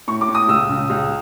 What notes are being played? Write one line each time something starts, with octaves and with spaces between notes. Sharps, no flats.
A2 C#6
D6
A2
D#6
C#2 E6
C#3
C#2